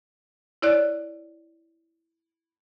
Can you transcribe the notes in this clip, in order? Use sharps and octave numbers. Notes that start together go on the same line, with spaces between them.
E4 C#5 D5 F#6